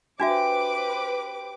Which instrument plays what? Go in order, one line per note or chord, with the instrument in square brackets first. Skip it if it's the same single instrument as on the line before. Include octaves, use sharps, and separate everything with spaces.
[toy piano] D4 F#4 E5 [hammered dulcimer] G4 [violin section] B4 C5 D6